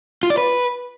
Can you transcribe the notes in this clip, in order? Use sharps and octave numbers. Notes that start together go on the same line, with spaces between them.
F4
D5
B4